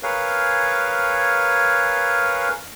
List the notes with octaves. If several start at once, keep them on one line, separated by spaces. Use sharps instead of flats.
G#4 A#4 B4 C#5 F5